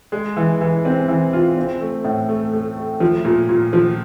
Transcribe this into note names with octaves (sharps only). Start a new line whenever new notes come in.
G#3
E3
E3
C4
E3
F4
C4
A3
A2
A3
A3
A3
F3
A#2
A#2
F3